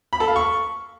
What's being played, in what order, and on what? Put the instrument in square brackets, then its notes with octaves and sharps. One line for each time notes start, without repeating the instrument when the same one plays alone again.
[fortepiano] B5
A4
F5
C#6